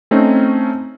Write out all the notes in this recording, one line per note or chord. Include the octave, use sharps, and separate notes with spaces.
A3 C4 C#4 D#4